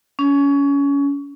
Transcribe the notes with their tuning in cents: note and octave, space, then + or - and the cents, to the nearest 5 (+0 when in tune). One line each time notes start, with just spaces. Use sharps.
C#4 +25